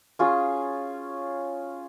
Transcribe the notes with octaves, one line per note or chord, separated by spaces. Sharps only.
C#4 F4 G#4